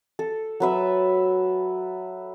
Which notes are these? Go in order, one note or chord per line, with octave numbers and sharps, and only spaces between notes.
A4
F#3 B4 E5